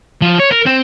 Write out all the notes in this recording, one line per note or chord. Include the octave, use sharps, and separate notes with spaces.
F3
C#5
A#4
C4